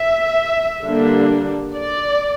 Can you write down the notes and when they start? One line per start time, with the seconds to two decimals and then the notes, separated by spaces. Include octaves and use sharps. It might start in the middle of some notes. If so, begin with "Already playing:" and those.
Already playing: E5
0.84 D3 G3 A#3 D4
1.75 D5